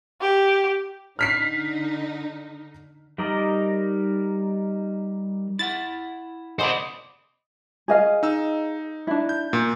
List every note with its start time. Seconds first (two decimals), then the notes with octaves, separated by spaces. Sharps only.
0.21 G4
1.19 D3 D#4 F6 B6 C7
3.18 G3 D#4 A#4 D5 D#5
5.59 E4 E5 F#5 A6
6.59 C5 D5 D#5 F#5 B5 D#6
7.88 G#4 D#5 F5
8.23 D#4 E6
9.07 D4 E4
9.29 G6
9.53 A#2